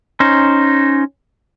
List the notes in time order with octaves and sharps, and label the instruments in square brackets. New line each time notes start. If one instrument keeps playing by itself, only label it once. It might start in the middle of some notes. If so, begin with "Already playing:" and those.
[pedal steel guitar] C#4 D#4 C5